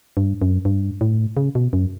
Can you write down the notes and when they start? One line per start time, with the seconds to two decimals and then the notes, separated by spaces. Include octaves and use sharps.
0.17 G2
0.42 F#2
0.65 G2
1.01 A2
1.37 C#3
1.55 B2
1.73 F#2